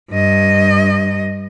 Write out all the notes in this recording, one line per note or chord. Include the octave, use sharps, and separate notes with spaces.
G2 D#5